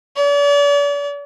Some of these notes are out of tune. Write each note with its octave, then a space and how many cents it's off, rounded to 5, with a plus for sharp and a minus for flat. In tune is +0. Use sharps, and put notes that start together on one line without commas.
D5 -40